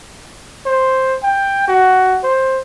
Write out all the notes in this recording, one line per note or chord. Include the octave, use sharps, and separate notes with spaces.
C5
G5
F#4
C5